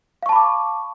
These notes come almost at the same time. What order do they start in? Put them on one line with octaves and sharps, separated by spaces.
F5 C#6 A5 B5 D6